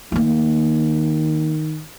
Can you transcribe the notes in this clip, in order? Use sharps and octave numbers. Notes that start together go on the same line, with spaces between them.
D#3 A3 A#3